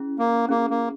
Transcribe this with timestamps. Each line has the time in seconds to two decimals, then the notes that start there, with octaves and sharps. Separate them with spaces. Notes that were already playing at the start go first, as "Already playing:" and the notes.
Already playing: C#4 E4 G#4
0.19 A#3
0.49 A#3 C#4 E4 G#4
0.70 A#3